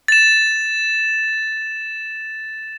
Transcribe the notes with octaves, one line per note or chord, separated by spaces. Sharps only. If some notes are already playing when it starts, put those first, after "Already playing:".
A6 E7